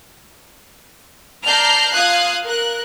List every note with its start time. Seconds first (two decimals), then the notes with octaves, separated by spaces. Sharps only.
1.46 D5 A5 A#5 F6 G6 C7
1.94 F4 F5 D#6 F#6 G#6
2.46 A#4 F#6